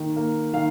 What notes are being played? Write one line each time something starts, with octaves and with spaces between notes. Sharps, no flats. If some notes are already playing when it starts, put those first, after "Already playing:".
Already playing: D#3 A#3
A#3
D#3 F5